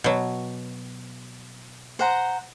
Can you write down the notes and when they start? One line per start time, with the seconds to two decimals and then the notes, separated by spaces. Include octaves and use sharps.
0.04 B2 F#3
1.99 C5 F#5 A#5